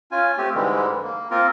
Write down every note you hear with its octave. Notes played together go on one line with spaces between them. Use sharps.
C#4 F4 G#5
A3 C4 G4
G#2 D3 E3 G3 G#3
A#3
A#3 C4 F4 A#4